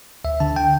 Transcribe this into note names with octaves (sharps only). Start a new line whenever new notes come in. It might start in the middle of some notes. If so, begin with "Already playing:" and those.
D2 E5
D3 A5
G5